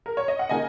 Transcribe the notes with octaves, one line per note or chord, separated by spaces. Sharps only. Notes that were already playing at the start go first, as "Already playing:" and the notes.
A#4
C#5
D#5
F#5
C#3 A#3 D#4 D#5 G#5